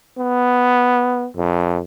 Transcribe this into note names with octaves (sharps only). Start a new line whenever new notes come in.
B3
F2